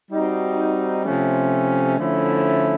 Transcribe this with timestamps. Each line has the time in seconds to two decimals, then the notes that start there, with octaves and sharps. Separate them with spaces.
0.10 G3 C4 D#4 F#4
1.04 C3 F3 A3 C#4
1.98 D3 F3 A3 C#4 E4